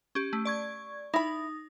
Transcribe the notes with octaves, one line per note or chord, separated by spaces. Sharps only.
C#4 G4
A3
D5 C#6 G#6
D#4 E4 B5 D#6